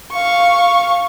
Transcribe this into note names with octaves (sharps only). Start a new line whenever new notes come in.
F5 C#6